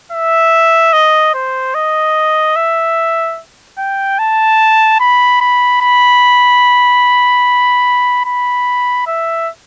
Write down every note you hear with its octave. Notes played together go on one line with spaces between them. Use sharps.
E5
D#5
C5
D#5
E5
G5
A5
B5
B5
B5
B5
E5